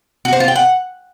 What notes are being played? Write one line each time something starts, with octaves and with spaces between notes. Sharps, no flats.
F#4
C5
F4
G5
F#5